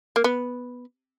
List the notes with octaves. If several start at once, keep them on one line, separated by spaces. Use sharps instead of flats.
A#3
B3